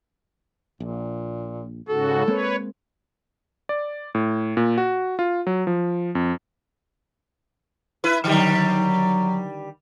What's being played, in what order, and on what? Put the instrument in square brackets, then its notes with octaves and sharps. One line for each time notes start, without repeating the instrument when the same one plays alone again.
[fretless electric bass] A#1 [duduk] A#2
[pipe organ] G#2 C#3 F#4 [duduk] A4
[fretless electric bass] G#3 A#3 C4 [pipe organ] B4 C#5
[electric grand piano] D5
A2
A#2
F#4
F4
F#3
F3
F2
[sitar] E4 B4
[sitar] D3 D#3 G3 [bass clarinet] F#3